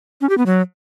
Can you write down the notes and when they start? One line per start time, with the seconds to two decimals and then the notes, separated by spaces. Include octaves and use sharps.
0.21 C#4
0.29 G4
0.38 B3
0.46 F#3